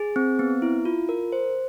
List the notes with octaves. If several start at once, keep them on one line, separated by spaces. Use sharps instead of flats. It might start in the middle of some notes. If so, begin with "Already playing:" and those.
Already playing: G#4
C4
B3
E4
F4
A#4
C5